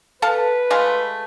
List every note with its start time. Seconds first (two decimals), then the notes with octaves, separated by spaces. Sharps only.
0.22 A4 B4 F5 A5
0.70 G#3 A3 F4